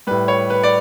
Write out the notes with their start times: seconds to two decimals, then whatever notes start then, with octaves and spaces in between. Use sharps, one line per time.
0.07 A2 G3 B4
0.28 C#5
0.50 B4
0.63 D5